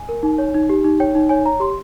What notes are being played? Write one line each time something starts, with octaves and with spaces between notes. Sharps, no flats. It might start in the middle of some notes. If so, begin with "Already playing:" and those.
Already playing: G#5
A#4
D#4
C#5
D#4
G4
D#4
C#5 G5
D#4
C#5 G#5
C#5 A#5
G4 C6